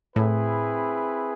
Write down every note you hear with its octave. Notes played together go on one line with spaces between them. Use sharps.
A2 C4 E4 G#4 B4